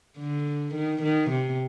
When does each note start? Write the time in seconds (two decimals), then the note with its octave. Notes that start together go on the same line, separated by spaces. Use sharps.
0.18 D3
0.74 D#3
1.02 D#3
1.30 C3